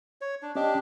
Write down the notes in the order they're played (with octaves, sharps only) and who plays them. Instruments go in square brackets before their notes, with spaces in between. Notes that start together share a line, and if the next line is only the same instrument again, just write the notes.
[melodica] C#5
D4
[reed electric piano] C#4 D#5 [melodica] D4 G4